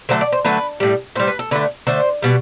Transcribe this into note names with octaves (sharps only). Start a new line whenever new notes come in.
D3 F#3 A3 C5
D5
C5
D3 F#3 A3 B4
A2 G3
A2 G3 C5
B4
A4
D3 A3 B4
D3 A3 C5
B2 G3